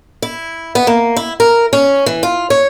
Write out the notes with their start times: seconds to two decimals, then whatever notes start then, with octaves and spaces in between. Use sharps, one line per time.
0.22 E4
0.75 B3
0.87 A#3
1.16 E4
1.40 A#4
1.73 C#4
2.06 E3
2.23 F4
2.50 C#5